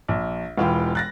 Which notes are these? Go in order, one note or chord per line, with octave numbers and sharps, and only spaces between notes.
A#1
E1 E3 F4 G5
F#6 A6 A#6